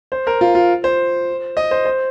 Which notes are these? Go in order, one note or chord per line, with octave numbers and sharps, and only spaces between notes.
C5
A#4
F4
F4
C5
D#5
C5
C5